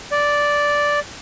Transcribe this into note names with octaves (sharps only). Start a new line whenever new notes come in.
D5